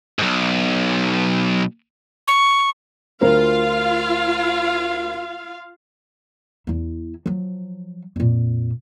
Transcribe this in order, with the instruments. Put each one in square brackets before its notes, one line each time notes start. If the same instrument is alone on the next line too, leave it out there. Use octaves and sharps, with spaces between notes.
[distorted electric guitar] B1 G#2
[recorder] C#6
[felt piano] D2 A#4 C5 [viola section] F4 F5
[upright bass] E2 E4
F3 F#3
F2 A#2